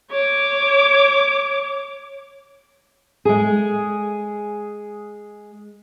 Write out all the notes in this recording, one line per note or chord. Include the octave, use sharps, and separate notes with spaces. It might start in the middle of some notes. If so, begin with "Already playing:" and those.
C#5 D6
G#3 G#4